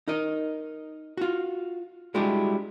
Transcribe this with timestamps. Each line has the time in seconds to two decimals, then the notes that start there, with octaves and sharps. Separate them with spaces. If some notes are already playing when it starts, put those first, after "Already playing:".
0.08 D#4 A#4 D#5
1.17 F4 F#4
2.14 G3 G#3 D4 E4 F#4 G4